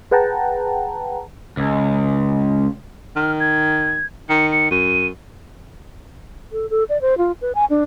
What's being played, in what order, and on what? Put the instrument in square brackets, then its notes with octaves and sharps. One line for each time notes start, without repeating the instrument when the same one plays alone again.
[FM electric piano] G#4 B4 F#5 G5 A5 A#5
[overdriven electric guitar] C#2
[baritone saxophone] D#3 [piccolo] F6
[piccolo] G#6
[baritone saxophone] D#3 [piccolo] C#7
[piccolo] C#7
[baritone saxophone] F#2 [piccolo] D#7
[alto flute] A4
A4
D5
C5
F4
B4
G#5
D4